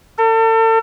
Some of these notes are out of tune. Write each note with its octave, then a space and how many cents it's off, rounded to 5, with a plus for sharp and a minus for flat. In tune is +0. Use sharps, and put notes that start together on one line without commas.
A4 +40